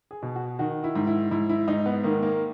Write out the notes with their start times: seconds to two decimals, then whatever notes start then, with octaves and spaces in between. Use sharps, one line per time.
0.11 G#4
0.23 B2
0.35 F#4
0.59 D#3 F#4
0.84 E4
0.95 G#2
1.07 E4
1.31 G#2 E4
1.49 E4
1.68 G#2 D#4
1.86 B3
2.03 D#3 A#3
2.23 A#3